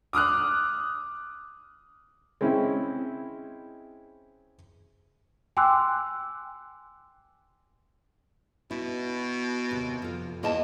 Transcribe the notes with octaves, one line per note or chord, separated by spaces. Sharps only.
D6 D#6 F6 F#6
G#3 C4 C#4 E4
G5 G#5 C6 D6 E6 F#6
B2 E4
D#2 C3
F2 F4
E2 A#3 D#5 A5